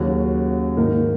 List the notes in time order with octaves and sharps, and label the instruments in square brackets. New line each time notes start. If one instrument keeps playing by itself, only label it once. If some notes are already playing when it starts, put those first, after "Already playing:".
Already playing: [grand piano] D#2 C#3 F#3 C#4 F#4
G#2 D#3 A#3 D#4 A#4